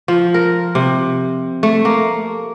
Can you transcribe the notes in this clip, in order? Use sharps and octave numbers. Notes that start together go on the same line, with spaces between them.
F3
A#4
C3
A3
A#3